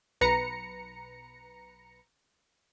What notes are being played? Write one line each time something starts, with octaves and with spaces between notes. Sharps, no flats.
B1 B4 A#5 C#7